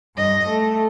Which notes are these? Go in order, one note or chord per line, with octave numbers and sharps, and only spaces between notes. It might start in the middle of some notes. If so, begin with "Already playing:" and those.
G2 D#5
A3